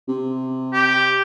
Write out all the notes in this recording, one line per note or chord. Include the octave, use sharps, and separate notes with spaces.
C3
G4